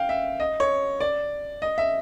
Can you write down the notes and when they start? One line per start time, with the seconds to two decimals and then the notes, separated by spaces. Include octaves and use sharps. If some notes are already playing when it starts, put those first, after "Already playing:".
Already playing: F5 G5
0.09 E5
0.40 D#5
0.60 C#5
1.00 D5
1.62 D#5
1.78 E5